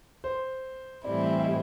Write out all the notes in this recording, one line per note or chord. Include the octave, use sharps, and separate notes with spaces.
C5
A2 E3 G3 C4 E4 D5
E5
E5
D#5